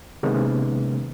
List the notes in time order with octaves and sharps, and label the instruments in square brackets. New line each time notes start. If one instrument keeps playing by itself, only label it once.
[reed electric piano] C3 D#3 G#3 A#3 B3 C#4